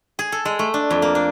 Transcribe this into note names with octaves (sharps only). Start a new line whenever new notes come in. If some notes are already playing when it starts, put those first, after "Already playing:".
G#4
A4
G#3
A3
D4
F2
A#3
D4